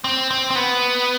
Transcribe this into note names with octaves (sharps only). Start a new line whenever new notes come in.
C4
C4
C4
B3